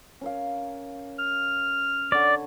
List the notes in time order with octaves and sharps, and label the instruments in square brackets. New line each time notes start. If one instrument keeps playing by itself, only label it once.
[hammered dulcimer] C#4 A#4 F5
[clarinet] F6
[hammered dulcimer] D3 C#5 [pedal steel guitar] D5